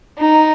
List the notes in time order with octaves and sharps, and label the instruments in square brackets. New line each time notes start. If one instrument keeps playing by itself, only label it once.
[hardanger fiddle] D#4